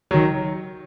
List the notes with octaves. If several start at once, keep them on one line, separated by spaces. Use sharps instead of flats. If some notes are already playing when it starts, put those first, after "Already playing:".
D#3 F#3